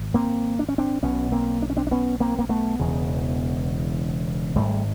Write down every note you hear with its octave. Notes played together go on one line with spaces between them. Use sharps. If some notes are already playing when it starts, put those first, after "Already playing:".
Already playing: G#1
A#3 C4
D4
C#4
C4 D4
B1 B2 B3 C#4
A#3 C4
D4
C#4
C4 D4
D4
B3 C#4
A#3 C4
A#3
A3 B3
E1 E2 C#3
G#1 G#2 G3 A3